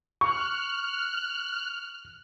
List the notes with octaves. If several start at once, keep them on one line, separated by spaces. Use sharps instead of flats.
C#6 F6 F#6